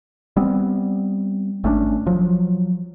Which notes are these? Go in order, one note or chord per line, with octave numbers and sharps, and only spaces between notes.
G3 B3 C4
G#1 A3 C#4 D4
F3 F#3